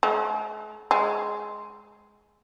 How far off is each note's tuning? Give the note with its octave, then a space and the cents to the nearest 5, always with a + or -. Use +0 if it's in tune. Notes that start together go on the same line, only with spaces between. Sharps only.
G#3 +45
G#3 +10